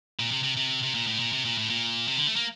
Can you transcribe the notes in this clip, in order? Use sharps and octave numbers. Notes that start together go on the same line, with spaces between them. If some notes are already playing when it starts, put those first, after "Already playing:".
A#2
C3
C3
C3
C3
A#2
A2
A#2
C3
A#2
A2
A#2
C3
D3
A3
A#3